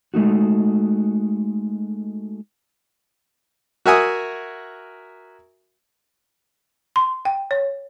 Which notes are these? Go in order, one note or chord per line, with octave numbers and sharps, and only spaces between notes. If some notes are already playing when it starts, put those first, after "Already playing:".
G#3 A3 D#4 F#4
F#4 A#4 E5 F#5 G#5 D#6
C6
G5
C#5